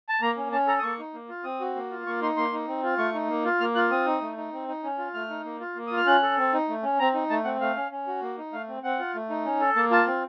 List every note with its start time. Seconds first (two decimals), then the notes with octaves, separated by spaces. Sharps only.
0.09 A5
0.21 A#3 A#5
0.37 C#4
0.52 C#4 A5
0.67 A4 A#5
0.79 D#6
0.83 A#3 C#6
0.99 D#4
1.14 A#3
1.29 F4
1.44 C4 D#6
1.60 F#4
1.76 A#3
1.91 F4
2.06 A#3 C#6
2.21 D#4 C6
2.37 A#3 C6
2.53 D#4
2.68 C4
2.83 F4
2.98 A3 C#6
3.14 D#4
3.29 A#3
3.45 F4
3.60 A#3 F6
3.75 F4 F#6
3.91 C4 D#6
4.06 D#4
4.21 A3
4.37 D#4
4.53 C4
4.68 D#4
4.84 C#4
4.98 F4
5.14 A3 F6
5.30 D#4
5.45 A#3
5.60 F4
5.75 A#3
5.87 F4 D#6
5.97 F6
6.06 C#4 F#6
6.22 A4
6.37 C4
6.53 D#4
6.69 A3
6.83 C#4
7.00 C4 A#5
7.14 D#4
7.30 A3 A5
7.45 C4 F#5
7.61 A3 F5
7.76 C#4
7.92 C#4
8.07 F#4
8.22 A#3
8.38 D#4
8.53 A3 F5
8.68 C4
8.83 C4 F#5
8.99 F4
9.15 A3
9.30 D#4
9.45 C#4
9.60 A4
9.76 A#3 A5
9.91 F4 A5
10.07 C4